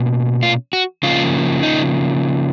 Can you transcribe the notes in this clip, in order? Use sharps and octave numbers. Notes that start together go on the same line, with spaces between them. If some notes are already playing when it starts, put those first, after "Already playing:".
Already playing: B2 A#3 C#4
F4
F#4
C#3 F3 A#3 F4
D#4